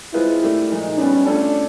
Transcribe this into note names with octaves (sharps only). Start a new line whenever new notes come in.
G#3 C4 E4 F4 G#4 B4
A3 D4 G4 A#4
A#2 F3 G#3 D#4
G3 B3 C#4 D4
A3 C#4 D4 F4 A4